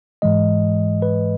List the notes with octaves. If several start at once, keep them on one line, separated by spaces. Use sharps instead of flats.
G#2 E3 G#3 D#5
B4